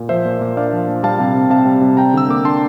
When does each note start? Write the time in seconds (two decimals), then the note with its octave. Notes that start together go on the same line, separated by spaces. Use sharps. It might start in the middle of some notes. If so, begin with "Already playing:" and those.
Already playing: A#2
0.09 F3 C5 E5
0.25 A#2
0.41 A#3
0.57 D4 D5 F5
0.73 F3
0.88 A#2
1.03 G3 F5 A5
1.19 C3
1.35 C4
1.50 C3 F5 A5
1.66 G3
1.81 C3
1.97 G3 G5 A#5
2.14 D3 E6
2.28 A#3 D6
2.45 D4 A5 C6